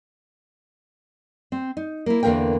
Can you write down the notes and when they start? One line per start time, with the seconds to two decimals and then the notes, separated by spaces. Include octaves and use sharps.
1.52 C4
1.77 D#4
2.06 A#3 E4
2.23 E2 D3 E3 A#3 A#4 G5